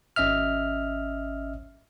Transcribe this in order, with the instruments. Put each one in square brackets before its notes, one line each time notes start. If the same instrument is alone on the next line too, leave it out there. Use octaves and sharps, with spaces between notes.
[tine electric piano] G#1 C#4 D#5 E5 F6